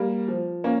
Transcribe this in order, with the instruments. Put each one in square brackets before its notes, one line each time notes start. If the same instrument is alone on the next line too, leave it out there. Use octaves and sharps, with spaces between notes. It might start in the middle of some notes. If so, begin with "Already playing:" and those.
Already playing: [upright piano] G3 A#3
F3
A#3 C#4